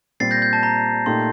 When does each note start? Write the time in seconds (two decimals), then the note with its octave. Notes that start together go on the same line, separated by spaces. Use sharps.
0.20 A#2 G3 C4 A6 C7
0.31 G6 A#6
0.42 G6
0.53 A5
0.63 A#5
1.06 A#2 A3 D#4 G4 C6